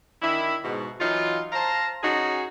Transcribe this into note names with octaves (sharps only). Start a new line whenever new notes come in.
D#3 D4 E4
G#2 B2
E3 F#3 D#4 F4
C5 F5 A5 A#5
C#4 D#4 F#4 G#4